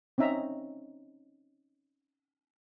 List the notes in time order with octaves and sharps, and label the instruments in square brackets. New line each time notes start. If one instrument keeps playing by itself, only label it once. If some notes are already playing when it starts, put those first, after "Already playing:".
[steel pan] C4 C#4 D#4 E5 A#5